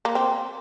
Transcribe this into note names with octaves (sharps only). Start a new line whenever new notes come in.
A#3
C4